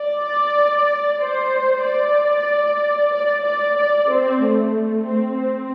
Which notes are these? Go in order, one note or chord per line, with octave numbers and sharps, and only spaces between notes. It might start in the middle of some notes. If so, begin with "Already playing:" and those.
Already playing: D5
C5
D5
D5
D5
D5
C4
A3
A3
C4
C4